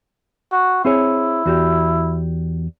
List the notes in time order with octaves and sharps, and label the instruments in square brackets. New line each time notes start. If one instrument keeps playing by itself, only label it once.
[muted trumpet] F#4
[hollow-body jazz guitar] C4 G#4 C#5 [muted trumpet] E4
[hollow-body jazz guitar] E2 F#4 G4